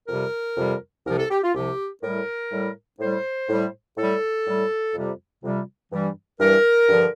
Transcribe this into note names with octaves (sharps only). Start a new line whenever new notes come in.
F2 C3 G3 A#4
F2 C3 G3
C2 C3 F3 A#4
A4
G4
F4
C2 C3 F3 G4
A2 G3 A#4
A2 G3
A2 G3 C5
A2 G3
A2 G3 A4
A2 G3
F2 C3 G3
F2 C3 G3
G2 E3 G3
G2 E3 G3 A#4
G2 D3 F3